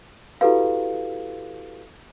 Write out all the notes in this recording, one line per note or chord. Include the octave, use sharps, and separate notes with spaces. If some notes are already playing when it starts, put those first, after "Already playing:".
E4 F#4 G4 A4 B4 F5